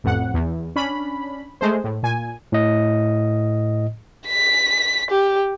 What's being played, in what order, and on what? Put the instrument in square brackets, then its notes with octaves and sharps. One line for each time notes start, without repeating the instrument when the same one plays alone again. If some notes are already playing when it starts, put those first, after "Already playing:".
[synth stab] A1 F2 F#5
E2
C#4 D4 B5
G#3 A3 C5
A2
A#2 G#5
[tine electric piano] A2 D#5
[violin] B6
G4